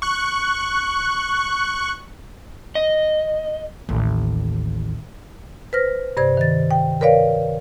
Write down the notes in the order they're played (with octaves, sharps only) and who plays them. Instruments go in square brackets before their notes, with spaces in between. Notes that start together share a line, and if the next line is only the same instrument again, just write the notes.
[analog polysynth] C#6 F#6
[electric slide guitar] D#5
[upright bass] A1 D#2
[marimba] B4 C5 F6 A#6
G2 C3 C5 D5 G#6
D#3 A6
G5
A#4 B4 C#5 D5 F5